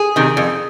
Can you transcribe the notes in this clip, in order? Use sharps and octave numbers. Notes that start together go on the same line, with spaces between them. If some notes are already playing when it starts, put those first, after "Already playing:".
Already playing: G#4
C3 D#3
F2